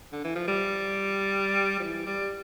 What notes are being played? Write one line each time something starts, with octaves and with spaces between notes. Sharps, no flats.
D3
E3
F3
G3
F3
E3
G3